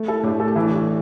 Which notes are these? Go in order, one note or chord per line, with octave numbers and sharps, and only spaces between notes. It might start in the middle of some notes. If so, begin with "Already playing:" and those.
Already playing: A3
E4 A4
A2 D4 G4
A4
G4
E3 E4
D4 G4